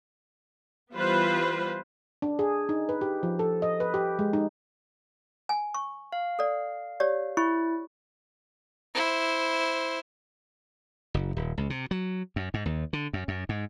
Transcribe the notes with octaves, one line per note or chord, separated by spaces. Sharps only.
E3 G3 B3 F4 B4 C5
D4
G#4
D#4
B4
G4
F3
A4
D#5
B4
G4
G#3
D#4
G#5
C#6
F5
A4 D5
G4 C#5 D5
E4 C#6
E4 C5
F#1
D#1
C#2
C3
F#3
F#2
G#2
D#2
D3
F#2
F#2
G#2